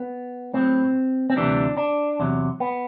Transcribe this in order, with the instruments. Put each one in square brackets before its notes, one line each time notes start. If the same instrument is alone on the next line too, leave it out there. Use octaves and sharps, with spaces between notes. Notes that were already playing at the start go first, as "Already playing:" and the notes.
Already playing: [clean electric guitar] B3
A2 F#3 C4
C4
D2 C3 E3 G3 D4
D4
E2 C3 F#3
B3